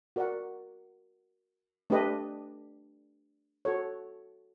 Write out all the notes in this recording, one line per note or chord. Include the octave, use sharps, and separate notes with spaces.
F#4 A#4 D5 F#5
A3 D4 G4 B4 D#5
F#4 A4 C#5